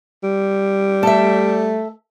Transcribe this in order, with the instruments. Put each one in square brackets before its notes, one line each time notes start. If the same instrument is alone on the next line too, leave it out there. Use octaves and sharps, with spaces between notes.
[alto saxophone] G3
[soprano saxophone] A3 [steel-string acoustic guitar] A4 E5